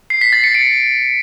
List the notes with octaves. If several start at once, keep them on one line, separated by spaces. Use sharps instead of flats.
C7
B6
A6
C#7
D7